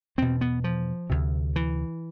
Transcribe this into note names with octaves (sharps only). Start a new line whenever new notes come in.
E2 B2 C4
B3
F3
D2 C3
E3